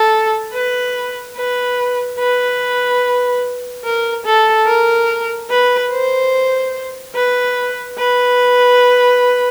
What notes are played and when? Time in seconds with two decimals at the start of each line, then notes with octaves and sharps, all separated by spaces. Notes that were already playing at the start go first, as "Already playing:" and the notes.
Already playing: A4
0.53 B4
1.36 B4
2.19 B4
3.85 A#4
4.25 A4
4.67 A#4
5.50 B4
5.91 C5
7.15 B4
7.98 B4